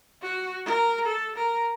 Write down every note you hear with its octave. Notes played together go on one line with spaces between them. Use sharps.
F#4
A#4
A4
A#4